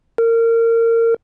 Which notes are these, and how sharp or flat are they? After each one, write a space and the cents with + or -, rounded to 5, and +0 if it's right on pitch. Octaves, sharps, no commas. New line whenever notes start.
A#4 -25